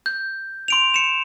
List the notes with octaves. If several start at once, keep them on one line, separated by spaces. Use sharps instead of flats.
G6
C6 D7 F7
C#7 E7